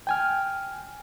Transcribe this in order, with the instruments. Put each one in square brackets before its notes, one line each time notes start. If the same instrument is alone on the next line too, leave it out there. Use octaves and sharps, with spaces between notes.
[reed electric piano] G5 G#5 F6